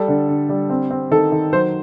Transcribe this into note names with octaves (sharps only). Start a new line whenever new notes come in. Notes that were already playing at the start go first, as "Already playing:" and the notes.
Already playing: G3 A4
D3
D3
G3
C4
C4
D#3 A4
D#3
F#3 C5